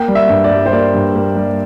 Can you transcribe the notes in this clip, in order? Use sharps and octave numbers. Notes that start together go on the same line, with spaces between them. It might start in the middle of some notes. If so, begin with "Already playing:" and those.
Already playing: A#3 G5
G3
E5
G2
D5
G3
C5
A#3 D5
G2
A#3
G3